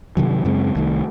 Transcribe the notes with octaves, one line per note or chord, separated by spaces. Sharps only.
G2 C3 D#3 F#3
F#2 C#3 G#3 C4
C2 D#3 A3